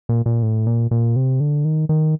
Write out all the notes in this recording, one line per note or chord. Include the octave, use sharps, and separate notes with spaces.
A#2
A#2
A2
A#2
A#2
C3
D3
D#3
D#3